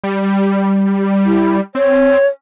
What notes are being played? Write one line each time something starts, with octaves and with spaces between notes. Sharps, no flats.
G3
E4
C4 C#5